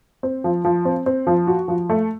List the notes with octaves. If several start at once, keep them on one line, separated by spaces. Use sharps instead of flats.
C4
F3
F3
C4
C4
F3
F#4
F3
A3